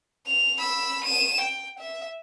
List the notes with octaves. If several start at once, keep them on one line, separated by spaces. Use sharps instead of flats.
F7
B5 E6
D#7 E7
G5
E5